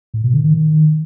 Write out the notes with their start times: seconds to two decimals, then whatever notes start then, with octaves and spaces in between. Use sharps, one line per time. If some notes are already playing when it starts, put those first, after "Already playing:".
0.14 A2
0.24 B2
0.34 D3
0.44 D#3
0.54 D#3